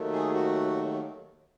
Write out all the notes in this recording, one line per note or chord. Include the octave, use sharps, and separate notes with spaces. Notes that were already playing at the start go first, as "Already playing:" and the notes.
Already playing: D#2 D#3 F#3 A3
G#4
F#4